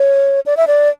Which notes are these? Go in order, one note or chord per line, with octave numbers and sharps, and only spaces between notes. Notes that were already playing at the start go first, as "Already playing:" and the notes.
Already playing: C#5
D5
E5
D5